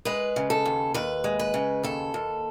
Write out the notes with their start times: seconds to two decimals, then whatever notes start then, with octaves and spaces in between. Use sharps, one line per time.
0.05 G#3 B4
0.36 C#3
0.50 A4
0.66 D#2
0.94 D#2 B4
1.24 G#3
1.39 B4
1.54 C#3
1.83 D#2 A4
2.14 D#2